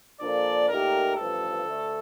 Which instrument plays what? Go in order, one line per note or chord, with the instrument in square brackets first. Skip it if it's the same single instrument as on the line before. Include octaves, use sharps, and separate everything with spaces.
[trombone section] A#2 F3 A#3 D4 A4 [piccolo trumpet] D5
[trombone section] A#2 A3 D#4 G4 [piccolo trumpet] A#4
[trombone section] A1 G2 F3 [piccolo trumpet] A4
[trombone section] D2 D3 A3